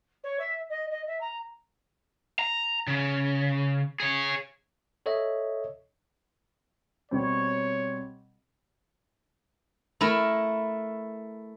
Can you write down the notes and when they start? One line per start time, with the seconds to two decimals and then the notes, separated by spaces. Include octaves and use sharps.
0.24 C#5
0.39 E5
0.70 D#5
0.91 D#5
1.07 E5
1.21 A#5
2.39 A#5
2.87 C#3
4.00 G#4 C#5
5.06 A4 C#5 D#5 E5
7.11 B2 G3 C4 C#5
10.01 A3 E4 A#4